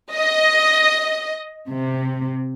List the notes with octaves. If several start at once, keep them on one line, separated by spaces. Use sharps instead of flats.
D#5
C3